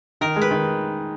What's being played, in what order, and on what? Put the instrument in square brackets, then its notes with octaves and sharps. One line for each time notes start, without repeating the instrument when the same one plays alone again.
[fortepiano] D#3 [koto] A#4
[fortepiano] G#3
[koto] B4
[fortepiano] D#3